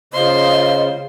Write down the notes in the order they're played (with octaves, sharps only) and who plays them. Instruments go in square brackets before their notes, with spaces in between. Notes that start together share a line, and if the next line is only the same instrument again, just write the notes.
[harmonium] C#3 [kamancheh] F4 C5 [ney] D#5 [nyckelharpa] C6